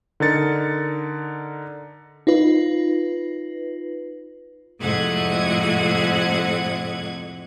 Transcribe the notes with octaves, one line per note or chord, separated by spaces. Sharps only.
D3 D#4 A#4 A6 C#7
D#4 F4 B4
F2 A2 C3 G#3 F#5 G#6